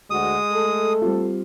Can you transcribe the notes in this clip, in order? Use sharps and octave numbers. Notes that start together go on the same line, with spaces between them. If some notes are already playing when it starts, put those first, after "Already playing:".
D2 G#3 F#4 D#6
A3 A4
G3 C4 F4